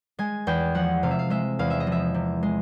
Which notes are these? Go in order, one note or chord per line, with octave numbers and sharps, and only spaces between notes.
G#3 G#5
E2 G5
F3 F#5
C3 F5
E5
F5
G#3 E5
E2 F5
E5
D#5
F3
E5
C3
G#3